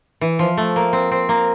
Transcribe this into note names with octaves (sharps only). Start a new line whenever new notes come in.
E3
F3
A3
A#3
C4
C4
A#3